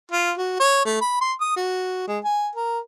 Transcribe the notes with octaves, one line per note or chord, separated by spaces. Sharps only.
F4
F#4
C#5
A3
B5
C6
D#6
F#4
G#3
G#5
A#4